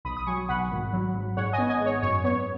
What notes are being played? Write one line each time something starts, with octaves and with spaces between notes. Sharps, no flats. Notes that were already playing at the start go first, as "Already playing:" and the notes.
B1 B5 D#6
D#6
F#3 G#5 C#6
B1 F#5 B5
G#1
F#3
G#1
G#2 C#5 F#5
D#5 G#5
B3
D#5 G#5
G#2
C#5
F#2 C#5
B3 C#5